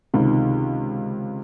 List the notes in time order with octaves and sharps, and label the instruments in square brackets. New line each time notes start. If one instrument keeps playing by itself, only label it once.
[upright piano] C#2 C3 D#3